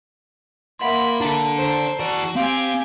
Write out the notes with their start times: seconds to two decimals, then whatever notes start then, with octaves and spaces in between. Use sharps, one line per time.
0.79 A#3 E5 F#5 B5 C6
1.21 D4 A4 A5 A#5
1.57 C5
2.00 E3 F#4 D5
2.36 C4 G4 F5 G#5